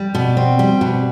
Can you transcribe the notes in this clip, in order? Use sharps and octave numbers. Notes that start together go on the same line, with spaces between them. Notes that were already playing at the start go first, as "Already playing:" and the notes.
Already playing: G3
B2
C4
G3
B2